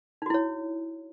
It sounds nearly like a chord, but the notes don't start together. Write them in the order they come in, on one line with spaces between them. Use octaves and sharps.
D#4 F#4 E4 C#5